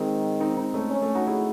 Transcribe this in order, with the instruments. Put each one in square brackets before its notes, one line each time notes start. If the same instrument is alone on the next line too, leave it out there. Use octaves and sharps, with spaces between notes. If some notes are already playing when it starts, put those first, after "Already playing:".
Already playing: [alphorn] D#3 [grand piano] G#3 C4
[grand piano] C4 D#4
C4 D#4
A3 C#4
[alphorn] C#4
[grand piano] A3
D#4 F#4
E4 G#4